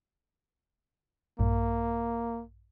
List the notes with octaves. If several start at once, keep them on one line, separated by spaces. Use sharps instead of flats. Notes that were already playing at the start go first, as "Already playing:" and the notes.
A#1 G2 A#3